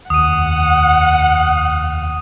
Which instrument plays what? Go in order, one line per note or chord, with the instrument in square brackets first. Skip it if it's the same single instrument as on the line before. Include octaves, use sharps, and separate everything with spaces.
[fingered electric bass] F1 D#2 [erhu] F#5 [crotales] D#6 D#7